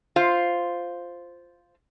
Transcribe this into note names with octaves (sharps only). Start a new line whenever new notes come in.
F4 C5 F5